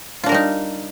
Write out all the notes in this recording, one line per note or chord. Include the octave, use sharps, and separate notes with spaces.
G3 D4 D#4 F4 A#4